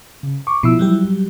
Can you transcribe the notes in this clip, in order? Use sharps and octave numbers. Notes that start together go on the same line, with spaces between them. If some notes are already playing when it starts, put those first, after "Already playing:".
C#3
C#6 D6
B2 F3 E4 E6
F#3 G3 G4